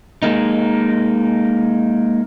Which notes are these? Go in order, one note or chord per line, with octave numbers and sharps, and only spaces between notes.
G#3 A#3 D#4